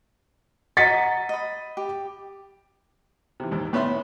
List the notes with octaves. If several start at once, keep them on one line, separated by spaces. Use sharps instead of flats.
F#4 D#5 A#5 A6 B6 C#7
D#5 B5
G4
C3 E3
D#2 G#2 D#3
A2 B3 C#4 E5 C6